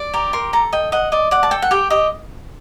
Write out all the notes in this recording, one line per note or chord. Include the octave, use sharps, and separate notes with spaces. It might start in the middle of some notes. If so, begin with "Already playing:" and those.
Already playing: D5
G4 A#5
A#4 C6
A4 A#5
D#5 G5
D#5 F#5
D5 D#5
D5 F#5
A5
A4 G5
F#5
G4 G5
G4 D#5